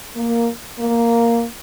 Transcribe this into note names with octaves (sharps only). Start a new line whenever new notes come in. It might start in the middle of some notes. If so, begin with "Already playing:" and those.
A#3
A#3